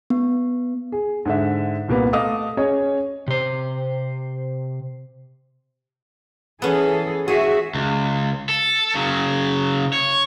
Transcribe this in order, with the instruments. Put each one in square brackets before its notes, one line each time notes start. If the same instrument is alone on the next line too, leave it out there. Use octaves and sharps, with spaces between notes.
[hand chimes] B3
[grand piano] G#4
G#2 D3 E5
C2 A#2 A#3 B3 B4
A3 D#5 F5 D6 D#6
C#4 G#4 C#5 D#5 G#5
[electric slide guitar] C3 C5
[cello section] E3 G#4 A4 [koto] B3 C#4
[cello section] F#4 E5 [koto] G#4
[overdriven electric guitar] C#2
A4
C#3 F#3
C#5